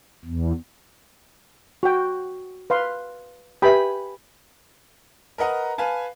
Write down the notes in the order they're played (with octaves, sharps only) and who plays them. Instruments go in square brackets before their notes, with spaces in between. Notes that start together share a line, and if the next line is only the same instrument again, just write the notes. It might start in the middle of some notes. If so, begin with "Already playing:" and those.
[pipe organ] E2
[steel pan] F#4 G5
B4 F5 C6
[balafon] G4 B4 E5 [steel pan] G5 G#5 B5
[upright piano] A#4 B4 D#5 F#5 A#5
B4 F5 G#5 A5